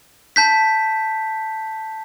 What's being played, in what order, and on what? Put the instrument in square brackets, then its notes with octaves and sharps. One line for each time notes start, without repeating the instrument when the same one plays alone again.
[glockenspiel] A5 G6 B6